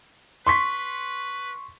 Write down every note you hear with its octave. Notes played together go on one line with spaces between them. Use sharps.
B4 C6 C#6 B6